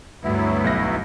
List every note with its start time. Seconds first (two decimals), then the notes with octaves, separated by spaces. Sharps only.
0.23 D2 G2 F#3 B3 E4
0.64 B1 A#6